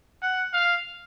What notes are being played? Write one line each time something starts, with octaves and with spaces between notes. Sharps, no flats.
F#5
F5